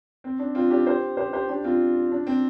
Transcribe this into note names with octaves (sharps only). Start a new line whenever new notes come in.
C4
D4
C4 F4
D4 G4
G4 C5
G4 C5
G4 C5
D4 G4
C4 F4
D4
C4